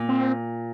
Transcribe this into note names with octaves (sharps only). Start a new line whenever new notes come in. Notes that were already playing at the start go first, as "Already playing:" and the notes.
Already playing: A#2
C4